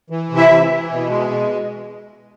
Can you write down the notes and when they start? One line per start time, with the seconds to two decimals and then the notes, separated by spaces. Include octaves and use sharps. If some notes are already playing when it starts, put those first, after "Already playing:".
0.10 E3
0.30 C3
0.37 E4 E5
0.50 E3
0.70 E3
0.90 B2
1.09 G#3
1.29 B2